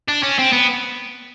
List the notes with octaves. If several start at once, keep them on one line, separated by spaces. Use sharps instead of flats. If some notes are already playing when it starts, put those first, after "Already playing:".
D4
C#4
C4
B3